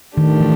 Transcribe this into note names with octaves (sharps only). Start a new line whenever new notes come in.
A2 D#3 F3 A3 D4 G4
E3